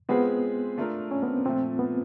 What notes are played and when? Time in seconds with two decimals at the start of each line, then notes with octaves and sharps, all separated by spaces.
0.09 G#3 B3 C4 F4 G#4 B4
0.78 A3 D4 F4 A#4
1.11 C#4
1.23 B3
1.28 C4
1.45 A#2 F3 A3 C4
1.79 B3